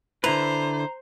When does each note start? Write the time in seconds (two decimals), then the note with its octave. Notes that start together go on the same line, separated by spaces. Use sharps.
0.24 D3 E4 B4 C5 A#5